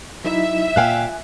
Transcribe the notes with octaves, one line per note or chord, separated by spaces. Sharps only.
F#3 D#4 E4 E5
A#2 F5 G5 G#5 F#6